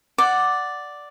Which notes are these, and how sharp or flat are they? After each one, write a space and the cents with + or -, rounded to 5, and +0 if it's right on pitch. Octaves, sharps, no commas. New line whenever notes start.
D5 +0 F#5 +0 D6 +0